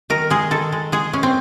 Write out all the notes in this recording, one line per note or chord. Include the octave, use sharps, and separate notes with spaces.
D#3 A#4
G#3 G#4
D#3 A4
G#3
G#3 G#4
G#3 C#4
C4